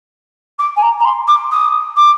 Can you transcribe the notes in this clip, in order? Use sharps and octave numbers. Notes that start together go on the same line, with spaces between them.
D6
G#5
A#5
A#5
C6
D6
D#6
D6